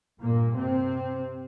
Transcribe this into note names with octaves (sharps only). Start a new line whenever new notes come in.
G2 A#2 A#3
C3 C4